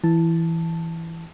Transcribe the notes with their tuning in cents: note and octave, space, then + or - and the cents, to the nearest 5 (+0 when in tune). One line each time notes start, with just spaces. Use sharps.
E3 +5 A5 +0